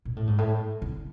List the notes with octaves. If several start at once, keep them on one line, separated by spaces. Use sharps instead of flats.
A#2
A2
G#2
A2
D3